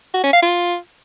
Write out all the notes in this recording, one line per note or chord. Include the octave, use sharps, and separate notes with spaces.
F#4
C#4
F5
F4